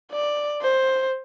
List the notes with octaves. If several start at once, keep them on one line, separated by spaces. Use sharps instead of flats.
D5
C5